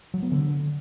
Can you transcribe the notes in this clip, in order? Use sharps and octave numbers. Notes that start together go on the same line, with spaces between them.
F#3
B3
D3